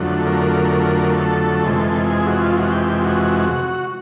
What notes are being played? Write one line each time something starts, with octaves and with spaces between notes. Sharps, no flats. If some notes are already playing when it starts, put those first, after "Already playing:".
Already playing: F2 D3 F#3 A3
A#4
A4
F2 C3 E3 G#3
G#4
F#4
F4
F#4
G4
G4
F#4